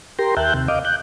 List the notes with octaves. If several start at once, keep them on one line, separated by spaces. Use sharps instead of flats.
G4 A#4 G5 A#5 C6
D#2 E5 G5 A5 F#6 G6
D#2 C3
D#5 F5 D6
F#6 G6